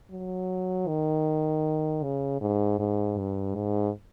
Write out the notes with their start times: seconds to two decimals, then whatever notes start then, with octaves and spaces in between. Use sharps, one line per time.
0.11 F#3
0.87 D#3
2.03 C#3
2.41 G#2
2.79 G#2
3.17 G2
3.55 G#2